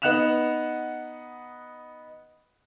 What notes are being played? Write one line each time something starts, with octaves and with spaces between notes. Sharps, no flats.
B3 D#4 F#5 F#6 E7 F7